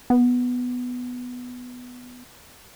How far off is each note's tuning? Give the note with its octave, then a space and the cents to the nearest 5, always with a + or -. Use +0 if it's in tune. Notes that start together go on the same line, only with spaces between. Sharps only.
B3 +5